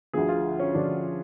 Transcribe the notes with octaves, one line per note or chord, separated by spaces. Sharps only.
D2 D3 F3 G#4
F4
C#4
D2 D3 F3 D4